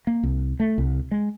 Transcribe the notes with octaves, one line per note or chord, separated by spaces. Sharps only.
A#3
C2
A3
C2
G#3